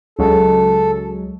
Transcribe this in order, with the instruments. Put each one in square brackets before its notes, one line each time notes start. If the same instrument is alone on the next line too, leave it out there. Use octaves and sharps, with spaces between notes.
[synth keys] C#2 F#3 G#3 [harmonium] A4